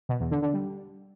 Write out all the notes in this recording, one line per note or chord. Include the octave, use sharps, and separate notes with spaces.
B2
E2
D3
D3
G3